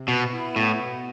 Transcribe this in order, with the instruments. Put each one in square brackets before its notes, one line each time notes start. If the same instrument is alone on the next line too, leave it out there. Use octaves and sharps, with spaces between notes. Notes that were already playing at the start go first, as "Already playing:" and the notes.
Already playing: [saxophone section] C3
[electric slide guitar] B2 [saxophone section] B3
[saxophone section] E4
[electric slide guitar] A2 [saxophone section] B3
[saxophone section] B2